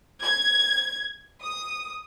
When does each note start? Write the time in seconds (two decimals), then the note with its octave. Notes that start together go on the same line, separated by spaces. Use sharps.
0.22 G#6
1.42 D#6